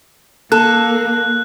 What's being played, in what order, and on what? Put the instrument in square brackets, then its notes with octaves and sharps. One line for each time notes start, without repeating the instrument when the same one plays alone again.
[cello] A#3 [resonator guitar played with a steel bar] A4 [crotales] F#6